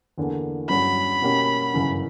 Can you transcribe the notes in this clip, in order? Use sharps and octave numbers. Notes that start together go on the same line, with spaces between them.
E2 D3 A#3
G2 F#3 C#4 B5
B2 A#3 C#4 G4
G1 F#2 C#3 E3